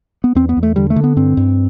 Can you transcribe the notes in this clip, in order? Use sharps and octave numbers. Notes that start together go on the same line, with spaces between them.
B3
E2 C4
B3
E2
A3
D3 G3
A3
D3
B3
G2 C4
G2